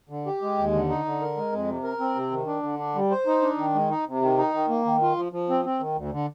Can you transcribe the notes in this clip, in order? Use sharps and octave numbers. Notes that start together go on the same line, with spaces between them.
D3
G4
G#3
D#2
D3
D#4
D3
A#4
G#3
F2
C3
A#4
C4
C3
D#3
D4
D3
D4
G3
C5
D#4
D4
D#3
G#3
D#4
C3
D#3
D#4
D#3
A#3
D#3
F4
F3
F3
C4
C4
D#3
D2
D3